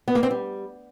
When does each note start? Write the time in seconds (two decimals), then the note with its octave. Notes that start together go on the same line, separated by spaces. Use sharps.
0.08 B3
0.15 A#3
0.23 C4
0.30 G3